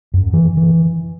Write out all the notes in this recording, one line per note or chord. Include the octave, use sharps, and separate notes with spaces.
F#2
E3
E3